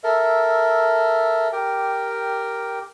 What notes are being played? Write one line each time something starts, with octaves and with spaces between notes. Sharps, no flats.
A4 A#4 E5
G4 A#4 G5